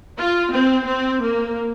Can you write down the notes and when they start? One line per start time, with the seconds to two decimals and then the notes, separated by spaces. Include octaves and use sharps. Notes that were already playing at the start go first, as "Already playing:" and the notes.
0.18 F4
0.52 C4
0.86 C4
1.21 A#3